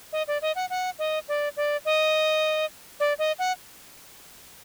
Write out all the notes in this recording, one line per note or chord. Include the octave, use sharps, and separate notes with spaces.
D#5
D5
D#5
F#5
F#5
D#5
D5
D5
D#5
D5
D#5
F#5